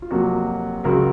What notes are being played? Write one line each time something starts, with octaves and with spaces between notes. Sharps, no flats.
F4
F2 C3 F#3 A#3 F#4
C#2 C#3 F#3 F#4 A#4